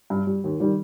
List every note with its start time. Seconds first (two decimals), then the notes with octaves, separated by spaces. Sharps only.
0.10 G2
0.27 G3
0.44 D#2
0.60 D#3 G3